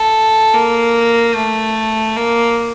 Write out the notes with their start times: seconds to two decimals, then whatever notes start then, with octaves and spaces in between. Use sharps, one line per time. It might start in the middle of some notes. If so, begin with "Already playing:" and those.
Already playing: A4
0.54 A#3
1.35 A3
2.16 A#3